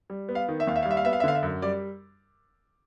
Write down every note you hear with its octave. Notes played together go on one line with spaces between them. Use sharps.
G3
B3
F5
D#3
E5
D#2 F5
E5
F5
G3
E5
F5
B3 E5
F5
E5
D3 F5
E5
F#2
G3 D5